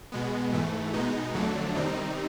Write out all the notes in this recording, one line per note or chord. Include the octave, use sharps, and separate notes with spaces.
B2 G#3 B3
G#2 E3 A3
B2 G#3 B3 D#4
F2 D3 F#3 A3 D4
C3 D#3 G3 C4 D#4